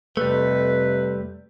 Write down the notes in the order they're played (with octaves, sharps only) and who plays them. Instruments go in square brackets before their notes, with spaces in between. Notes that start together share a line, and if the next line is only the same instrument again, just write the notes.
[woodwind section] F2 C3 B4 [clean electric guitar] G3 A3